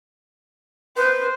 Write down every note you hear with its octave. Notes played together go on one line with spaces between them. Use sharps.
B4 C5